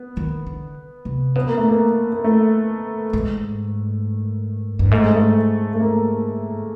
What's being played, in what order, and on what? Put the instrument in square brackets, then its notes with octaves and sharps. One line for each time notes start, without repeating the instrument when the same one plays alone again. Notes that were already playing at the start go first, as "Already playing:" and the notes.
Already playing: [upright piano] B3
[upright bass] D#3
D3
C3
[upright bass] B2 [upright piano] B3
[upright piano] A#3
A3
A#3
A#3
A3
[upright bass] G#2
G2
[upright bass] G#2 [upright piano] A3
[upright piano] G#3
A3
A3
A#3